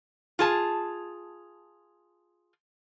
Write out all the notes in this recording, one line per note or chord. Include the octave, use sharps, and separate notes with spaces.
F4 G#4 A5